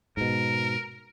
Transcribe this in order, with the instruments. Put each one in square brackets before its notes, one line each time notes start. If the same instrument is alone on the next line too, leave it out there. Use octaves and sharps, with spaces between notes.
[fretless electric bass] G#2 B2 [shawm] A#4